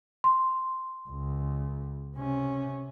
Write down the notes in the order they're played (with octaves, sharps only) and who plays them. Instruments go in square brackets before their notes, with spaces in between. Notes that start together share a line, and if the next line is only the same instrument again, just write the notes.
[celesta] C6
[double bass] C#2
C3 C#4